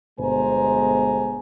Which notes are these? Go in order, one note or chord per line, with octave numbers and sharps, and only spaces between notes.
G1 B2 G#3 C5 G#5 A#5